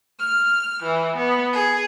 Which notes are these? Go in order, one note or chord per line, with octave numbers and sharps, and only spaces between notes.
F6
E3
B3
G#4